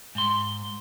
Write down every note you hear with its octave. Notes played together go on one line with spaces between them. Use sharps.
G#2 C6